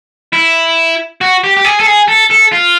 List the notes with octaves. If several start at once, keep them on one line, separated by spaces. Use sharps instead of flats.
E4
F#4
G4
G4
G#4
A4
G#4
A4
A4
F4